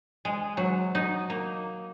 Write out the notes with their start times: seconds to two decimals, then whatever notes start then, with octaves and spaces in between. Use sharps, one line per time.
0.25 G#3
0.57 F#3
0.95 D#4
1.30 A#3